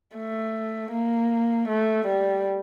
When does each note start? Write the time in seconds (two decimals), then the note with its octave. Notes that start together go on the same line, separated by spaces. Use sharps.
0.16 A3
0.92 A#3
1.68 A3
2.07 G3